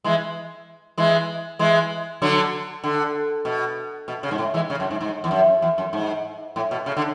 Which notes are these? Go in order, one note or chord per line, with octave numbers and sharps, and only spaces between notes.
E3 G#3
E3 G#3
E3 G#3
D3 F#3
D3
B2
B2
C#3
G#2
A2
E3 G#3
C#3
F#2
G#2
G#2
E2
F#2
E2
F#2
G#2
A2
B2
C#3
D3